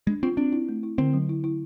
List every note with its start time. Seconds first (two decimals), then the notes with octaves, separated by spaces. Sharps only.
0.07 G#3 D4
0.23 C4 F4
0.37 C4 D4
0.53 E4
0.69 A3
0.83 E4
0.98 D3 C4
1.13 F#3
1.29 E4
1.44 E4